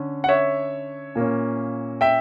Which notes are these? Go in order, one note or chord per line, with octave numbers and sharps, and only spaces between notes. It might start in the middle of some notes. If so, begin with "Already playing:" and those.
Already playing: D3 C#4
F#5
C#5 E5
A#2 A#3 C#4
E5 G5